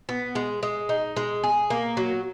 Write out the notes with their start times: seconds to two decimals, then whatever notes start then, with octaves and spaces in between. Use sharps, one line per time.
0.09 B3
0.35 G#3
0.63 G#3
0.89 D#4
1.16 G#3
1.43 G#4
1.70 A#3
1.97 F#3